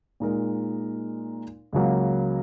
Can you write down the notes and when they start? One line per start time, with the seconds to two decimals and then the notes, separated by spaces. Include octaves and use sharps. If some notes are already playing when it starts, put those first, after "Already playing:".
0.20 A#2 G#3 D#4 A#4
1.73 C#2 C#3 F#3 A#3